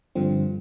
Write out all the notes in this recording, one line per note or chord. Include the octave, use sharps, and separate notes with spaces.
G2 D3 F3 C4